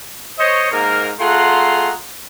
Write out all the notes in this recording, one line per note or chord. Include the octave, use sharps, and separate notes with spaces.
C5 C#5 D#5
G#2 A#3 A#4
A3 F4 G#4 F#5 A#5 C6